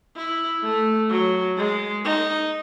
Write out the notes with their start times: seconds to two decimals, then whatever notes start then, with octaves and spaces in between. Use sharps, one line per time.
0.17 E4
0.64 A3
1.10 F#3
1.57 G#3
2.04 D#4